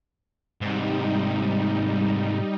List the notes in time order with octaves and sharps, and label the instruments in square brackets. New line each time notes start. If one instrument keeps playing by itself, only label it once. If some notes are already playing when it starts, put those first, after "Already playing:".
[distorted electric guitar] G#2 C3 [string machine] G3 D#4